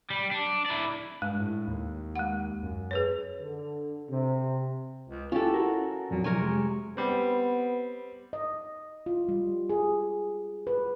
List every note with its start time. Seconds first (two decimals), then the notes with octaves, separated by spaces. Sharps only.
0.10 G3
0.31 D4
0.66 E4 D5
1.22 G2 G#3
1.40 A2
1.68 D#2
2.16 G#3 F#5
2.63 F#2
2.91 G#4 B4 C#5
3.41 D3
4.11 C3
5.09 C#2
5.32 C#4 E4 F4 G4 A4
5.54 F#4 A#4
6.11 F2 A#2 F#3
6.24 C3 A#4 C#5 G#5
6.42 G#3
6.97 G3 B3 C4
8.33 D#5
9.06 F4
9.29 G3
9.70 G#4
10.67 B4